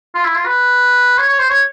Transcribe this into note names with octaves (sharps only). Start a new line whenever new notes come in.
F4
E4
F4
B4
C#5
C#5
C5
C#5